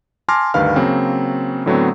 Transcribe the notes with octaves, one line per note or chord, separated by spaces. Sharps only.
G#5 A5 C6 D6 F6 A#6
D2 G2 D#3 B4 F5 F6
C#3 F#3 A#3 C4
A2 D3 F#3 A3 B3 C4